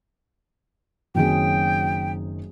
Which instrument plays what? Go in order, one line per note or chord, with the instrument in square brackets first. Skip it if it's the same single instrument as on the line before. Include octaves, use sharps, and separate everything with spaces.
[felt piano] F#1 D#3 C4 [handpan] F#3 G#4 [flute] G5